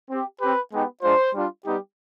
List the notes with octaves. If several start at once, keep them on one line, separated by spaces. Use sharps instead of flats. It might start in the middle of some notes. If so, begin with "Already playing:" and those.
C4 G4
C4 G4 B4
G#3 B3 D#4 G4
G#3 D4 F4 C5
G3 D4 F4
G3 B3 D#4 G4